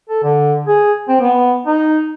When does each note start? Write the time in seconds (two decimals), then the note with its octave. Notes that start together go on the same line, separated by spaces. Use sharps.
0.10 A4
0.23 D3
0.67 G#4
1.09 C4
1.21 B3
1.66 D#4